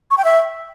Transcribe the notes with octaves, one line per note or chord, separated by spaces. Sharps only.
C#6
G5
E5